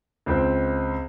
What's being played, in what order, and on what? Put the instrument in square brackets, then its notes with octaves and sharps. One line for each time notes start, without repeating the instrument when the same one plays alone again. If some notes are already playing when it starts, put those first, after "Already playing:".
[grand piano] C#2 C4